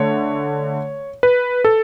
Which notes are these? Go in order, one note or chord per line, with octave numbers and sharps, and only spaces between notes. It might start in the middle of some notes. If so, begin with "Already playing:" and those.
Already playing: D3 A3 C#5
B4
A4